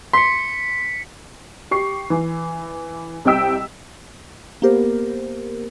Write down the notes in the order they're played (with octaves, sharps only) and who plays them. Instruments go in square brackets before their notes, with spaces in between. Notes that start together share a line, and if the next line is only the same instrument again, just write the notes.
[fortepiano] C6 [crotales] B6 C#7
[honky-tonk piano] G4 C#6 C7
E3
C2 C3 D#5 G5 E6 B6
[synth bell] A#3 B3 G4 A#4 C5